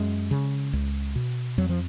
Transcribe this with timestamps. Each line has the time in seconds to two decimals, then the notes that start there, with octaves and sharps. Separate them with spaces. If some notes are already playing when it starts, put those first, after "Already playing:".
Already playing: F#2 G#3
0.31 C#3
0.73 C#2
1.16 B2
1.58 F2 F#3
1.69 F3